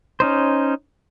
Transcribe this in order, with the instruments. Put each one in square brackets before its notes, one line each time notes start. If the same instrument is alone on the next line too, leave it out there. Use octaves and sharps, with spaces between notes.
[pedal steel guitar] C#4 D#4 C5